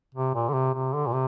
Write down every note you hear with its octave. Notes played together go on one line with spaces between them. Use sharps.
C3
A#2
D3
C3
C3
D3
A#2
C3